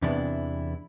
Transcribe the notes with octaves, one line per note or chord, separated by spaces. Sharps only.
E2 C3 E3 B3 D4 E4